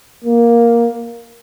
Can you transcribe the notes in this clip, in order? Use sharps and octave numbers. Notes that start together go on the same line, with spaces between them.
A#3